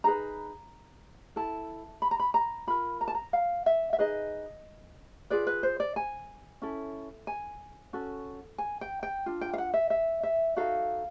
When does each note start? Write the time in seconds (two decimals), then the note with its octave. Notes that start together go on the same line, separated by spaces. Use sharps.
0.04 D#4 G#4 B4 A#5
1.36 E4 A4 A5
2.02 B5
2.11 A#5
2.20 B5
2.34 A#5
2.67 F4 A#4 B5
3.01 A#5
3.08 A5
3.15 A#5
3.33 F5
3.66 E5
3.93 E5
3.99 D#4 G#4 B4 D#5
5.30 F4 G#4 B4 D5
5.47 B4
5.63 C5
5.80 D5
5.96 G#5
6.62 C#4 E4 A4
7.27 G#5
7.93 C#4 F#4 A4
8.58 G#5
8.81 G5
9.03 G5
9.26 D4 F4
9.41 G5
9.53 F5
9.58 F#5
9.74 E5
9.90 E5
10.23 E5
10.56 D#4 F#4 A4 F5